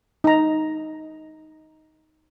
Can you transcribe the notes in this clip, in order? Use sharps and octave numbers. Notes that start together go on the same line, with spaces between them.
D#4 A#5